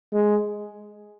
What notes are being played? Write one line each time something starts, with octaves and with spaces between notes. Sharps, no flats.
G#3